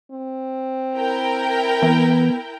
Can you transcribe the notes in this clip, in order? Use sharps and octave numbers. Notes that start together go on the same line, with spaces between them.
C4
E4 A#4 G5
E3 B3